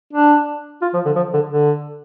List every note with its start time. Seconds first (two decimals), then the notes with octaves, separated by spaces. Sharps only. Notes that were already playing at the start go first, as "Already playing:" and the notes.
0.13 D4
0.82 F4
0.94 F3
1.05 D3
1.16 F3
1.33 D3
1.50 D3